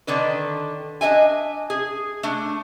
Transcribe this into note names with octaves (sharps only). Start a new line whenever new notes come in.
D3 D#3 D4 B4
D4 D#5 E5 G#5
G#4
A3 D4